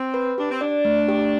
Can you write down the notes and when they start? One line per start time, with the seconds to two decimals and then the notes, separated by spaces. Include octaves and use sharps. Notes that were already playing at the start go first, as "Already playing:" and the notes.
Already playing: C4
0.14 B4
0.38 D4 G4
0.50 C4
0.61 D4 D5
0.85 A3
1.09 G4